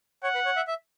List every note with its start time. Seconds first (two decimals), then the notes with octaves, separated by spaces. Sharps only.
0.23 C#5 F#5
0.35 B4
0.45 C#5
0.56 E5
0.68 E5